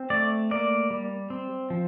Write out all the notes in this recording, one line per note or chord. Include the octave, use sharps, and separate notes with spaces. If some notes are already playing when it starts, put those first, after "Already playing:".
Already playing: C4
A3 D5
A#3 D5
G3
C4
F3